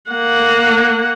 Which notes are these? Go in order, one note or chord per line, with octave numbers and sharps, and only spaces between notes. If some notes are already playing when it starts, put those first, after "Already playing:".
A#3 F#5